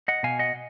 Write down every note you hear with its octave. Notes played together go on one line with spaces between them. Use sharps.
D#5 F#5
B2 F5 G#5
D#5 F#5